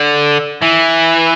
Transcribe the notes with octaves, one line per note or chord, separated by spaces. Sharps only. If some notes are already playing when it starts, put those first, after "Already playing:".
Already playing: D3
E3